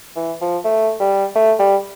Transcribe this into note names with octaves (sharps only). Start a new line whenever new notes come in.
E3
F3
A3
G3
A3
G3